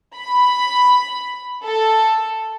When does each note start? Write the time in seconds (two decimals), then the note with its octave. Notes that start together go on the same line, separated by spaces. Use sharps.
0.14 B5
1.64 A4